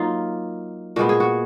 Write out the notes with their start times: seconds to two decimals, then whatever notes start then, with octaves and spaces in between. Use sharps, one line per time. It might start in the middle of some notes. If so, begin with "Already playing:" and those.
Already playing: F#3 A#3 D#4 F4
0.96 A#2 G#3 B3 F#4
1.09 G#4
1.20 F#4